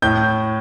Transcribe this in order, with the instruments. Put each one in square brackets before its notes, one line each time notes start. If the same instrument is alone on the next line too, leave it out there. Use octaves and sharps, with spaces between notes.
[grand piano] A2 G6